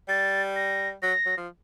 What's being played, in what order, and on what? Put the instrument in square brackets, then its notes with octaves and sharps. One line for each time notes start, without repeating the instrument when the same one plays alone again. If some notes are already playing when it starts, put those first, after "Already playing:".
[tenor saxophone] G3 [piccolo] A6
[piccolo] A#6
[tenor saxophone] F#3 [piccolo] A#6
[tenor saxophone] F#3
F3